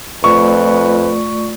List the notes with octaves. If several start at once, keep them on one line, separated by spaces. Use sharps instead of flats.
F2 A3 F4 B4 D5 C#6